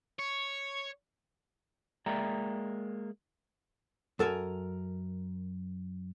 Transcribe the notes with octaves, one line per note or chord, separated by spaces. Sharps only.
C#5
G#3 A#3 D5 E5 G5 A#5
F#2 A4 A#4 G#5